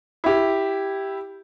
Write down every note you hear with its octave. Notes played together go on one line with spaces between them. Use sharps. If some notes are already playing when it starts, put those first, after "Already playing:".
E4 G4